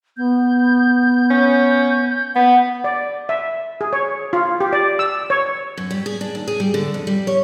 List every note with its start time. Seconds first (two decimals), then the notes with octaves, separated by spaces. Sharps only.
0.17 B3 G6
1.30 C#4
2.35 B3 F#5 B5
2.84 D5
3.29 E5
3.81 G#4
3.93 C#5
4.33 F4
4.61 G4
4.73 D5
4.99 E6
5.30 C#5
5.77 F#2
5.91 G3
6.06 G#4
6.21 D4
6.35 D#2
6.48 G#4
6.60 G3
6.74 D3
6.94 F2
7.07 G3
7.27 C#5